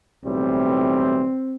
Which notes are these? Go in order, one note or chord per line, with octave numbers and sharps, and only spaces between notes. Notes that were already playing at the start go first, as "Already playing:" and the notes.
B1 A2 E3 G3 C4